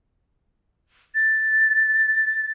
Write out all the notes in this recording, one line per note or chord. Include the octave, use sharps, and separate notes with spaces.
A6